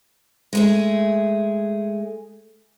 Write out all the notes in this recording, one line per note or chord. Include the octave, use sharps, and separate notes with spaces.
G#3 A3 G#4